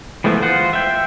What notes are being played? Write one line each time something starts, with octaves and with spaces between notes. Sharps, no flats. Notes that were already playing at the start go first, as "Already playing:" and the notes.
E3 F3 G#3 A3 B3
F4 C5 D#5 F#5
E5 G5